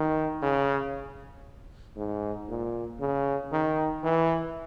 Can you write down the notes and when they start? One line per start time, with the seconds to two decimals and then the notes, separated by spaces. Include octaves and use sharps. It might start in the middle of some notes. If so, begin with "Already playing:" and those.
Already playing: D#3
0.42 C#3
1.96 G#2
2.48 A#2
3.00 C#3
3.52 D#3
4.03 E3